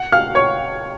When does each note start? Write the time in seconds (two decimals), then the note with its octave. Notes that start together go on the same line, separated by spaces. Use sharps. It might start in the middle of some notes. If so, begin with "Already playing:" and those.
Already playing: F#5
0.12 F5 F6
0.35 C#5 C#6